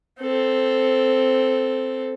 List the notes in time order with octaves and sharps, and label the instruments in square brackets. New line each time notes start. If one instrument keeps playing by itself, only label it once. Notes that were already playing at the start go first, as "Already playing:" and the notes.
[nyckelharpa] C4 A4